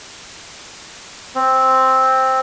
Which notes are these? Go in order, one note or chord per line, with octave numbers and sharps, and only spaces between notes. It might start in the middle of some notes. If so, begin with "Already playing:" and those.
C4